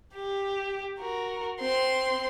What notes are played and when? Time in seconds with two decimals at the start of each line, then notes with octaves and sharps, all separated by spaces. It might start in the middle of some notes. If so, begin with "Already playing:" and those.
0.15 G4
1.00 F#4 A#4
1.60 C4 C6